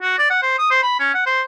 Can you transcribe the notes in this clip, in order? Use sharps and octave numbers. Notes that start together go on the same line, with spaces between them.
F#4
D5
F#5
C5
D#6
C5
B5
C#4
F#5
C5